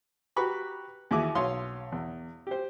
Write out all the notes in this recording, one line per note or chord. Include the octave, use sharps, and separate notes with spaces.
F#4 G4 B4 A#5 B5 C#6
D#2 E3 E4 F#4 G#4 D6
B1 C#5 F5 C6 D#6
E2
G4 C5